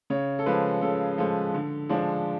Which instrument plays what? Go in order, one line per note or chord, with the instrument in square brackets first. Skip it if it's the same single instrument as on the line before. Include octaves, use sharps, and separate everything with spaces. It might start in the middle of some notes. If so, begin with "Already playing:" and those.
[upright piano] C#3 C#5
A4
F3 G#3 B4
C#3 A4
F3 G#3 A4
D3
F3 G#3 D4